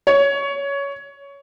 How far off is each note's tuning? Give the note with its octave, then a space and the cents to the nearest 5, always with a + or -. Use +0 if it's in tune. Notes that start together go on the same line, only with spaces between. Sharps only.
C#5 +15